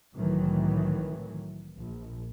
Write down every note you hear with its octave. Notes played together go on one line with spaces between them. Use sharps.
C2 A2 D#3 E3 F#3
A#1